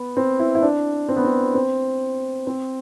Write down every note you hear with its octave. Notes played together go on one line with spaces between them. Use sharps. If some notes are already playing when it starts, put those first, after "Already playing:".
Already playing: B3
C4
E4
E4
D4
C4
B3
C4
C4
C4